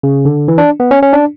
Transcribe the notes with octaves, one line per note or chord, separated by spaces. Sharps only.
C#3
D3
E3
D4
B3
C#4
C#4
D4